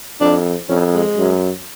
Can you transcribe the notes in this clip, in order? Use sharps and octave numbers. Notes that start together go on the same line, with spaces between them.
F2 D4
F2 C#4
G#3
F#2